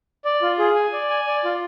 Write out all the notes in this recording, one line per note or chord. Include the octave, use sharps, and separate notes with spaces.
D5
F4
G#4
G#5
D5
G#5
D5
F4